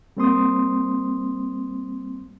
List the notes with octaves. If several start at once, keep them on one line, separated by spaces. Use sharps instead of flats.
G3 A#3 C4 C5 C6 D#6